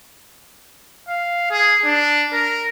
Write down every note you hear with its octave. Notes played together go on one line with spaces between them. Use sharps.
F5
G#4
D4
A#4